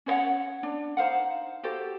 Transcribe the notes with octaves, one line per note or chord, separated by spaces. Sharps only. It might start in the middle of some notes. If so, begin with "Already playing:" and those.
C#4 C5 C#5 F#5
D4
D#4 C5 F5 F#5
F#4 G4 A4 C5